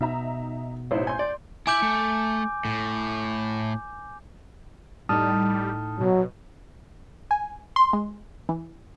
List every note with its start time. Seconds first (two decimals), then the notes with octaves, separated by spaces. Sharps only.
0.01 B2 D#4 E5 A#5
0.91 A1 D#4 E4 C5
1.07 G#5 C6 G6
1.19 D5
1.67 E4 E5 G#5 D6 G6
1.83 A3
2.65 A2
5.09 A2 G3 D#4 A5 D#6 F6
6.00 B2 F#3
7.31 G#5
7.76 C6
7.93 G#3
8.49 E3